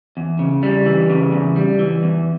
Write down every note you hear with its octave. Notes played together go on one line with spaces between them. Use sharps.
E2
C#3
G3
E3
C#3
E2
G3
E3
E2